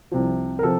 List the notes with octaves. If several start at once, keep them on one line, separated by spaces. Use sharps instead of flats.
C2 C3 F3
A#4
C3 F3 A4